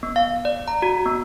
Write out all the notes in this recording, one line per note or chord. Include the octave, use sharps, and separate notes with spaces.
B3
F5
D5
A#5
F#4
B3